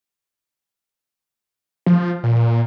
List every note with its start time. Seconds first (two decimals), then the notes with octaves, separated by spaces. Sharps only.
1.86 F3
2.23 A#2